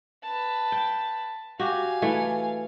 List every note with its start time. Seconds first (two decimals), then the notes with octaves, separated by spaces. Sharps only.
0.23 B4 A5
0.72 G5
1.60 F#4 G4 F5 G#5
2.02 E3 A3